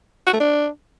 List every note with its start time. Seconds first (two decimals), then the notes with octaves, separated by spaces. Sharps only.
0.27 F#4
0.33 A3
0.40 D4